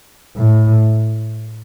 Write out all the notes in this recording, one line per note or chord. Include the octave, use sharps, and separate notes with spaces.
A2